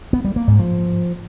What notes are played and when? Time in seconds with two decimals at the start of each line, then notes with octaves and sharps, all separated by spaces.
0.13 B3
0.25 G3
0.36 A#3
0.48 G#2
0.59 F3